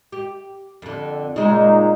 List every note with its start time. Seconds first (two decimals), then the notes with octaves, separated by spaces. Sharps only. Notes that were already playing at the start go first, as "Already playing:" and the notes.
0.12 G4
0.82 F2 D3
1.36 A#2 C#3 G#3 D#4